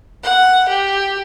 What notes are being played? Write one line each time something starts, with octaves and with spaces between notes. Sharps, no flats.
F#5
G4